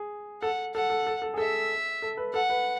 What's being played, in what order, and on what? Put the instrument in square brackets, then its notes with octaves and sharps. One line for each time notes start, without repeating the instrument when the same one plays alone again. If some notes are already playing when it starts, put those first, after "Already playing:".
Already playing: [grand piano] G#4
[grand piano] A4 [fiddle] F#5
[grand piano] A4 [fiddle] F#5
[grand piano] A4
A4
A4
G#4
[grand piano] A4 [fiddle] E5
[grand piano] A4
B4
[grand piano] A4 [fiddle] F#5
[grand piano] B4